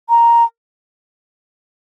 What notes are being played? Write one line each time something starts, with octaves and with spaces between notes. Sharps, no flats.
A#5